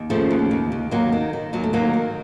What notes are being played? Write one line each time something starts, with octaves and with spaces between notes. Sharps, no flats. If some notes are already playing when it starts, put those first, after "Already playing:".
Already playing: D#2
C#3 F3 A3
D#2
D#2
D#2
D#2 F#3 A#3
D#3
D#3
D#2 F#3
A3
D#3 F#3 A#3
D#3